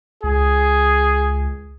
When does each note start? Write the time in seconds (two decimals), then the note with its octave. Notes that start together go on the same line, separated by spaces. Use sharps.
0.23 C#2 G#4